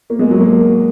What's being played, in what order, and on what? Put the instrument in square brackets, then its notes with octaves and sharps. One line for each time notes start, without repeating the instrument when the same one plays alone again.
[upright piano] A#3
G#3
F#3
A#3